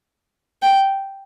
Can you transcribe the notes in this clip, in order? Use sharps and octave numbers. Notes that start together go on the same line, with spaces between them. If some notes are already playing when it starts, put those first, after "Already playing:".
G5